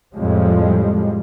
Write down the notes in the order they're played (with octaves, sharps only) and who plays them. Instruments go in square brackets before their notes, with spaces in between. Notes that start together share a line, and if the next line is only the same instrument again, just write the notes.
[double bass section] F2 A2 F3 G3 G#3